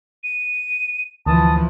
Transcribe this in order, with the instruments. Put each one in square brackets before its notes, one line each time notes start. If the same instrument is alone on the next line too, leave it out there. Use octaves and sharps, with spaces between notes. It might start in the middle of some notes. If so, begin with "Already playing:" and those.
[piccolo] D#7
[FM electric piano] D2 [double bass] E3 F3 [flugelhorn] A5 [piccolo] D#6